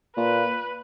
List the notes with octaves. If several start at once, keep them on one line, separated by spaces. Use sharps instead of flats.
A#2 B4